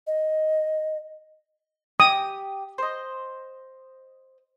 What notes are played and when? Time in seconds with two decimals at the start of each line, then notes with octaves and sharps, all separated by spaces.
0.07 D#5
2.00 G4 D#6
2.78 C5 D#5